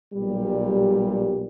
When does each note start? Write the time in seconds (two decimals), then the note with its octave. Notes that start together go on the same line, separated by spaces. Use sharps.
0.13 B1 A#2 G3